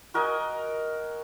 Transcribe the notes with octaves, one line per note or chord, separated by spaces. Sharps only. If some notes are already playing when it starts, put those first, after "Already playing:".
F#4 A#4 D#5 G#5